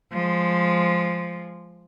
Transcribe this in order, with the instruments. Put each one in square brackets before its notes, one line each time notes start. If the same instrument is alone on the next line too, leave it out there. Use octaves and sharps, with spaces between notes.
[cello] F3 G#3